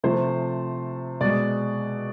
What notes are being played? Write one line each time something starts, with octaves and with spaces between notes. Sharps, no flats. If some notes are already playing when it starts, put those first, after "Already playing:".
C3 F3 A3 C5
B2 G#3 D5